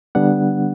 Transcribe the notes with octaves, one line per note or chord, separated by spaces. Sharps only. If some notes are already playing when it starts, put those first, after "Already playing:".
D3 G3 B3 D4 F#5